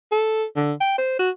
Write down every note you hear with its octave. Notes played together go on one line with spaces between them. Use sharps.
A4
D3
G5
C5
F#4